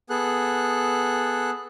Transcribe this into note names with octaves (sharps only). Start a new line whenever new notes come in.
B3 G#4 A4 F#6